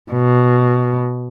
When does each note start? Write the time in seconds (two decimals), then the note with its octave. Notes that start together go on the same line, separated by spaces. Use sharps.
0.12 B2